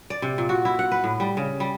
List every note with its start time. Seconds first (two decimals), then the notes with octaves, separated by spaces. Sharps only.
0.10 D5
0.22 C3
0.38 A#2
0.49 F#4
0.65 E4
0.79 F#5
0.92 B4
1.04 A2
1.20 G3
1.37 C#3
1.60 G3